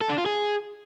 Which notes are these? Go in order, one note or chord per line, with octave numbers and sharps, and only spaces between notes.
A4
D4
F4
G#4